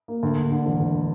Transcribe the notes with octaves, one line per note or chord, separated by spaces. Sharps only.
A#3
D2
D2
D3
E1
E1